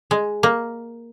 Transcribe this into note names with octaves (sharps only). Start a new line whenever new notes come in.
G#3
A#3